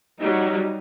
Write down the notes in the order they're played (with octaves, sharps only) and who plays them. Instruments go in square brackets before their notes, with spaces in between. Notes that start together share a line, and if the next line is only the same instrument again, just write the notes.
[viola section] F#3 G3 [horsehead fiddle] D#4